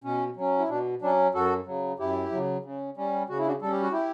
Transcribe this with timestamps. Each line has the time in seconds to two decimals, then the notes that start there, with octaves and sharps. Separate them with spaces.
0.04 B2 C#4
0.36 F#3 C#4
0.59 E4
0.69 B2 D4
1.02 F#3 C#4 D4
1.34 F#2 F#4 A4
1.66 C#3 F#3
1.99 F#2 E4 G4
2.32 C#3 F#3
2.64 C#3
2.97 G3 C#4
3.29 C#3 F#4
3.39 E4
3.47 D4 F#4
3.62 G3 C#4 A4
3.72 G4
3.82 F#4
3.92 E4 G4